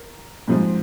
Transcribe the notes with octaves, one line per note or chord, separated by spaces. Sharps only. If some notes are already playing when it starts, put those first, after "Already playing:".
Already playing: A#4
G#2 F3 C4